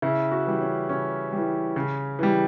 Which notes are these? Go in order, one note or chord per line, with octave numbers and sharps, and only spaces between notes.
C#3 E4
F#4
E3 G3
C#4
C#3 C#4
E3 G3
C#3
E3 G3